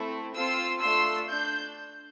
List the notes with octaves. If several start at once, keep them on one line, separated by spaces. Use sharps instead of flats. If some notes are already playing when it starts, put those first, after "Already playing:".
Already playing: A3 C4 E4 A4
C4 F4 A4 C6 E6
A3 D4 F4 A4 C6 E6
D4 G6